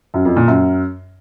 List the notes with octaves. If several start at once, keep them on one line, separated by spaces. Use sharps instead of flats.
F#2
F2
A#2
F#2